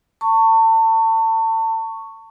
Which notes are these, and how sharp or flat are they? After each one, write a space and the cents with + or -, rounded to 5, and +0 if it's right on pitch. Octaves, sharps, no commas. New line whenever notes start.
A5 +35 C#6 +0